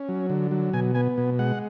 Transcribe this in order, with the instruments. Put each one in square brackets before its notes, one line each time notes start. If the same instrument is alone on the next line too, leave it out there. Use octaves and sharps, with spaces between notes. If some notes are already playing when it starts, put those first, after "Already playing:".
Already playing: [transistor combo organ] C#4
F#3
D3
F#3
B2 G#5
B3 G#5
B2
G#3 F#5